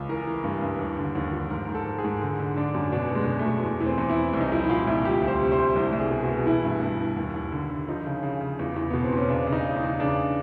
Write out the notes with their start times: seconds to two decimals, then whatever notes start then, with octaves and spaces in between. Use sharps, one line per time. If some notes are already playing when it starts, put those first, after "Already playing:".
Already playing: C#2
0.09 E3 A#4
0.27 E3
0.44 G2
0.62 G2
0.79 D#2
0.98 D3
1.15 D#2
1.33 F3
1.50 G#2 A#4
1.69 G#2
1.75 A4
1.86 G#2
1.98 G#4
2.04 G#2
2.22 D3
2.40 D3
2.56 D3 D4
2.74 F#2
2.92 B2 D4
3.10 B2 G#3
3.27 B2
3.39 A3
3.46 B2
3.63 E2
3.80 E3
3.86 C4
3.98 E2
4.10 E4
4.16 E3
4.33 C2
4.41 D#4
4.52 F3 E4
4.64 E4
4.70 A#2 F4
4.87 C2
5.04 D2 G4
5.22 D2
5.28 C5
5.40 C3
5.52 C5
5.58 D2
5.76 C2
5.93 C2
5.99 G#4
6.11 B2
6.23 F#4
6.29 B2
6.46 E3 E4
6.64 G2
6.82 G2
6.99 E3
7.16 D#2
7.34 D#2
7.52 D3
7.70 D3
7.88 F3 D#4
8.06 C#3
8.23 C#3
8.41 C#3
8.59 E2
8.76 E2
8.90 B2 B3
9.04 C4
9.12 E2 C#4
9.29 C#3 D4
9.47 C#3
9.53 D#4
9.65 C#3
9.77 D#4
9.83 E2
10.00 C#3 D4